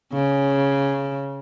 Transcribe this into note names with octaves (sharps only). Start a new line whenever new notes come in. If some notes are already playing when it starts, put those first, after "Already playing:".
C#3